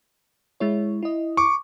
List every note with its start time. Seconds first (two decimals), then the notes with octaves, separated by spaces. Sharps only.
0.60 G#3 E4 C#5
1.03 E4 D#5
1.37 C#6 D6